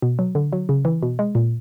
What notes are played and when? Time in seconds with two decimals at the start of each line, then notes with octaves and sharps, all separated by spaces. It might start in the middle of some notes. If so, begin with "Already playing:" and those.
0.02 B2
0.19 F#3
0.35 D3
0.53 F#3
0.69 C#3
0.85 E3
1.03 B2
1.19 G#3
1.35 A#2